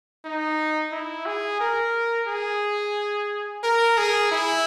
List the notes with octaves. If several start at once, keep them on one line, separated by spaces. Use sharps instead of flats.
D#4
E4
G#4
A#4
G#4
A#4
G#4
E4